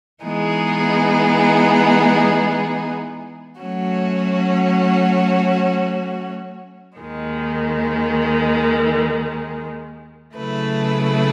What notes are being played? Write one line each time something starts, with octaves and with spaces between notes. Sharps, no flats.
E3 G#3 B3 D#4 G#4
F#3 A3 C#4 F#4 C#5
D#2 D#3 G#3
C#3 F#3 A3 E4 B4